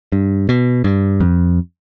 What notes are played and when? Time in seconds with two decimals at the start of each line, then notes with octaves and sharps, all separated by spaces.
0.12 G2
0.49 B2
0.84 G2
1.20 F2